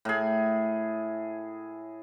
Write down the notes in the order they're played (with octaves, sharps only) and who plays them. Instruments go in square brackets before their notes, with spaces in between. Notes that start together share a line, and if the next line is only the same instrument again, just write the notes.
[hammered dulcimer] A2 G#4